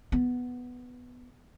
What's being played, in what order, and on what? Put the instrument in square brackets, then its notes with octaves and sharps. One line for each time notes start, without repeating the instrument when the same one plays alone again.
[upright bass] B3